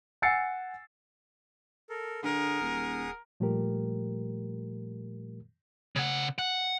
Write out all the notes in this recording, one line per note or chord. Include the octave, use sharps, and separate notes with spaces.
F#5 G#5 E6 A6 C7 C#7
A4 A#4
D3 G#4 A#4 F#5 D#6
D#1
A#2 F3 G3 A3 G4 A#4
C#3 F#5
F#5